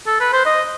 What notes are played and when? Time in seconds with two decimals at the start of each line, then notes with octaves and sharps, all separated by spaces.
0.07 A4
0.20 B4
0.33 C5
0.46 D#5